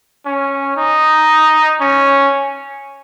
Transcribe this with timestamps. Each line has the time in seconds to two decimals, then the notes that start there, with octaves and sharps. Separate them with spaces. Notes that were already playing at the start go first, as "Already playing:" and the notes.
0.26 C#4
0.77 D#4
1.81 C#4